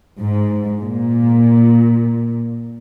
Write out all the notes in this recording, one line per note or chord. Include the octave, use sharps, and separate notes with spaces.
G#2
A#2